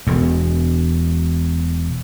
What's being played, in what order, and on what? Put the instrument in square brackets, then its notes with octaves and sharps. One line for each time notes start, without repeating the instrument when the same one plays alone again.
[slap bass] E1 E2